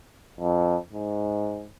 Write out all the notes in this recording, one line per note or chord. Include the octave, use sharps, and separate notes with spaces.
F2
G#2